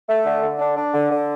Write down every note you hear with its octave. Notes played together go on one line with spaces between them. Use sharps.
A3
D3
D3
D4
D4
D3
D3